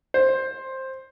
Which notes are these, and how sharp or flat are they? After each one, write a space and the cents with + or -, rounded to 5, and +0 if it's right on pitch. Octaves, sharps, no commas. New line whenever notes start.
C5 +10